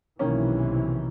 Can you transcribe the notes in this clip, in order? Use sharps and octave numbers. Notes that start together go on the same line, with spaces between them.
B1 C3 D#3 E3 A#3 C#4